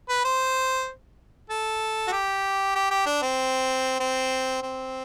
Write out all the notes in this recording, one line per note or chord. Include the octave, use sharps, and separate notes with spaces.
B4
C5
A4
F#4
G4
G4
G4
D4
C4
C4
C4